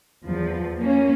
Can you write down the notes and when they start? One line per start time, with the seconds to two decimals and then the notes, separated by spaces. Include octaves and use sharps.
0.23 E2 F3
0.77 A#3 C#4